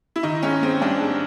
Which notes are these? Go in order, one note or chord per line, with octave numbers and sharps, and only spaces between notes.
E4
D#3 D#4
G#2 C#4
G#2 C4
G3 D4
G#2